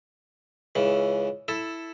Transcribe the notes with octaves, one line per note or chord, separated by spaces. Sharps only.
C#2 C#3 E3
E4 A4